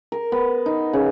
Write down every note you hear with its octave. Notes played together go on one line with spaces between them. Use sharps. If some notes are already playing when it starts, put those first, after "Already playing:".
A#4
B3
D#4
C#3